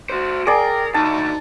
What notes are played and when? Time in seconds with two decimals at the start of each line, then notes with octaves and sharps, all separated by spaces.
0.09 F#4 C5
0.47 G#4 A#4 D5 G5
0.94 D2 D#4 A5